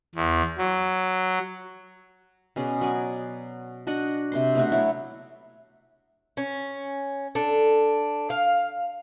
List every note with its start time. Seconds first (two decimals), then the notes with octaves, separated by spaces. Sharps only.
0.15 E2
0.58 F#3
2.56 B2 C#4 G#4 D5
2.81 F#3 D5 G#5
3.87 D4 F#4 D#5 F#5
4.32 C3 C5 C6
4.55 B2 A3 F#4
4.72 F#3 A3 E4 C#5
6.37 C#4
7.35 D4 A4
8.30 F5